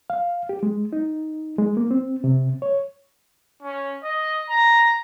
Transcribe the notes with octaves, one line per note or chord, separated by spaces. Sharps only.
F5
G4
G#3
D#4
G#3
A#3
C4
C3
C#5
C#4
D#5
A#5